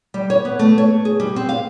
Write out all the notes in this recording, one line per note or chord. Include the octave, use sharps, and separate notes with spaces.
G3
C#5
B3
A3
C#5
G#4
G3
C4
F5